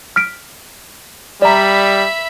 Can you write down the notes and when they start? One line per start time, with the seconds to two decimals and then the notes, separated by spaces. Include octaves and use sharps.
0.16 F6 B6 D7
1.42 G3 D5 E5 A#5 B5